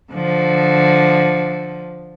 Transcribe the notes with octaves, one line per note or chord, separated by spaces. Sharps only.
D3 F3